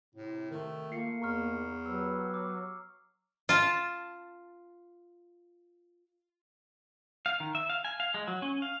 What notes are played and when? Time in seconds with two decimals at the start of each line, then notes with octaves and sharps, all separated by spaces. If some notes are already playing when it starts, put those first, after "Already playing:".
0.15 A2 C3
0.51 D#3 A3
0.92 A3 A#3 F4 C7 C#7
1.22 E2 G#2 C3 A#4 A#5 C#6 F6
1.86 F#3 B3 G4 B4 E6
2.34 D6
3.49 F4 A5
7.26 F5
7.40 D#3
7.55 E5
7.70 F5
7.85 G#5
8.00 F5
8.14 G#3
8.28 F#3
8.42 C#4
8.62 F5